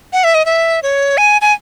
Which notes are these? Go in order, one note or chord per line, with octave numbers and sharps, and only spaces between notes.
F#5
E5
D#5
E5
C#5
G#5
G#5